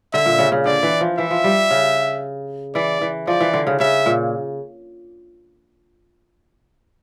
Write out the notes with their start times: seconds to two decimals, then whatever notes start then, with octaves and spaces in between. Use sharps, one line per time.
0.13 D3 E5
0.26 A#2
0.39 C#3
0.52 C#3
0.65 D3 D5
0.83 E3
1.01 F3
1.18 E3 E5
1.31 F3
1.44 G3
1.71 C#3
2.75 E3 D5
3.01 E3
3.27 F3 D5
3.41 E3
3.54 D3
3.67 C#3
3.79 C#3 E5
4.06 A#2